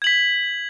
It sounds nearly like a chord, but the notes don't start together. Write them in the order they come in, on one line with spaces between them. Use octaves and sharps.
G#6 F#7 B6